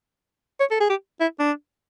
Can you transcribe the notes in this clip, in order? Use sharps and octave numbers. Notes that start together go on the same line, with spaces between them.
C#5
A4
G#4
G4
E4
D4